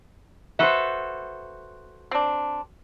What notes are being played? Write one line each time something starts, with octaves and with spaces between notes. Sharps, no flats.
F#4 A4 B4 C5 E5
C4 D4